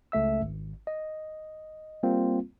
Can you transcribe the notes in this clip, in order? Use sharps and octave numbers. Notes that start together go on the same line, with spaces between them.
C#2 A3 E5 E6
G#1
D#5
G3 A#3 C4 F4